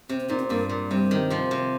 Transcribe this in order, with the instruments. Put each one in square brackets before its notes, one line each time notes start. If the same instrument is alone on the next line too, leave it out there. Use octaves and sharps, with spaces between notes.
[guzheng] C3 [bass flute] C4
[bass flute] C4
[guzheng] A#2 [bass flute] D#4
[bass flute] C4
[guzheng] G2 [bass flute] A#3
[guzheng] A#2
[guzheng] C3 [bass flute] G3
[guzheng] D#3
C3 F3
C3